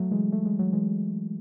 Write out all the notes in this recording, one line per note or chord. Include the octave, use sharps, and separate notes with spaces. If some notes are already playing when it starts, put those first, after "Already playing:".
Already playing: F#3 A3
E3 G#3
A3
G#3
F#3
E3 G#3